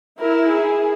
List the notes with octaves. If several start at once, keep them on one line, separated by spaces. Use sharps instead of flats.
E4 A#4
G#4